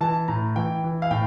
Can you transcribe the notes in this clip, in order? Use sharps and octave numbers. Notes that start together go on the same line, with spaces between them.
E3 A5
A2 A#5
E3 G5
E3
F5
A2 G5